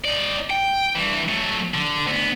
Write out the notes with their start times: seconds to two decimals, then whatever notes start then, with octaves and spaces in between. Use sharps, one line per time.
0.05 D#4 D5
0.50 G5
0.95 G2 E3
1.28 F#3 A3
1.74 D3
2.07 D2 B3